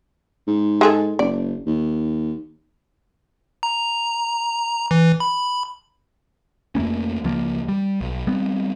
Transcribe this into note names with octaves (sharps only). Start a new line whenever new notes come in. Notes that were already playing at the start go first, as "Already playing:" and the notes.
G#2
G#3 G#4 A4
F#1 D5
D#2
A#5
E3
B5
F2 A3 A#3 C#4
C#2 F3 A#3
G3
B1
G3 B3 C4